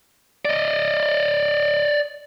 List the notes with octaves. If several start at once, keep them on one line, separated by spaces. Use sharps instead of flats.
D5 D#5